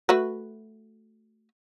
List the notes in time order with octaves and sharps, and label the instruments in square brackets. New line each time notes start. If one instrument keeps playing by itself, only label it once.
[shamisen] A3 F#4 B4